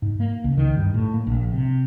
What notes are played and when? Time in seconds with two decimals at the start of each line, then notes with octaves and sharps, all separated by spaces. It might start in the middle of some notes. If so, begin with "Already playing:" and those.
0.02 G#2
0.20 A#3
0.44 C#2
0.57 D#3
0.77 G2
0.94 A2
1.14 A#3
1.27 A#1
1.52 C3